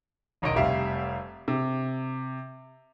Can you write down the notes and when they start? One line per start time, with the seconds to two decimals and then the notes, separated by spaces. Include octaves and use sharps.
0.42 E1 B1 D#3 D#5 D7
0.56 F1 G3 G4 E5 F5
1.48 C3